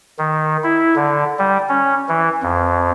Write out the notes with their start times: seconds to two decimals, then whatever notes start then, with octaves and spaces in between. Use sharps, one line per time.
0.19 D#3
0.63 E4
0.96 D3
1.39 G3
1.69 C#4
2.09 E3
2.43 F2